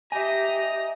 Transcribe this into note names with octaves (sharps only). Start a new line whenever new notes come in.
G4 D#5 E5 G#5 A#5